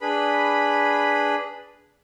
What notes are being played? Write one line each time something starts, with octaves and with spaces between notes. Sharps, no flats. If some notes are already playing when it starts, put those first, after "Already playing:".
D4 G#4 B4 B5